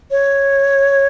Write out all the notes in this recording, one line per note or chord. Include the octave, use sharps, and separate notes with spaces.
C#5